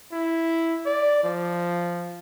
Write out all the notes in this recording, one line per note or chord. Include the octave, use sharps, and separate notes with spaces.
E4
D5
F3